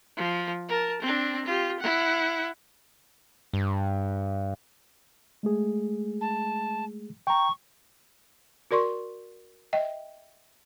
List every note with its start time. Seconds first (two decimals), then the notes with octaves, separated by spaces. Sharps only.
0.17 F3
0.69 A#4 A5
1.02 C4 D4
1.45 F4 G4
1.80 E4 F#5
3.53 G2
5.43 G#3 A3 G#4
6.21 A5
7.27 G5 A#5 C#6
8.71 F#4 A#4 D5 C6 C#6
9.73 D#5 E5 G5